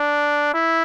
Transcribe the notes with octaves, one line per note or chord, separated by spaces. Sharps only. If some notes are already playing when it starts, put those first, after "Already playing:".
Already playing: D4
E4